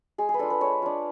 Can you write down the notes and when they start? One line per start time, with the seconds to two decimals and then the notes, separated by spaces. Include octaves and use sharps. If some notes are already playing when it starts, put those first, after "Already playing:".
0.18 G#3 G#4
0.29 G#4
0.34 B4
0.39 D4 F4 A4
0.50 B4
0.61 G#3 C#5
0.82 D4 F4